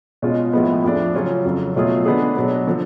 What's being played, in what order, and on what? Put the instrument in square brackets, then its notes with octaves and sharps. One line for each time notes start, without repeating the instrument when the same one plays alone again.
[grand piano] B2 G#3 C#4 F4
A2 F3 G#3 B3
F2 F3 A3 D4
C#3 F#3 C#4 F4
F2 C#3 F#3
B2 F#3 A3 F4 G#4
D3 G#3 B3 D4 G#4
B2 F#3 B3 D4
D3 F3